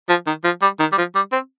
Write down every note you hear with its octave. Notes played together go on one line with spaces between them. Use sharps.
F3
D#3
F3
G3
D#3
G3
F3
G3
C4